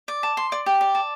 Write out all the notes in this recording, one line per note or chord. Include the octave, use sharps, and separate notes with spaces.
D5
A5
C6
D5
G4
D5
A5